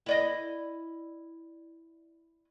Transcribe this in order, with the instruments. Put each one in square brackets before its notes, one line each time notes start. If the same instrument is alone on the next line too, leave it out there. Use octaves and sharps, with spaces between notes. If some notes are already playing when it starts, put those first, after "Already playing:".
[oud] E4 D5 D#5